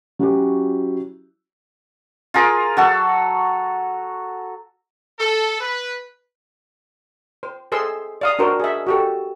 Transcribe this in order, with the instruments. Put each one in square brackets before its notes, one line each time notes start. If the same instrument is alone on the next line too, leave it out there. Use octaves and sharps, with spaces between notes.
[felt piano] F#3 C#4 E4 F#4 G4
[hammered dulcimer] F4 G#4 A#4
F#3 F#4 A4
[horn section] A4
B4
[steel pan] C5
G#4 A4 C5 C6 E6
D5 F5 D#6
D4 F#4 A#4 C5 D5
G#4 E5
F#4 G4 A4